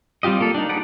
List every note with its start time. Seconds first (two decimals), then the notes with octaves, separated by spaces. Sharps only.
0.23 G3 C4 F4 G4 D#5
0.41 A#3 A4
0.54 D4 D#4
0.69 D#4 G#4 B4 D5 F#5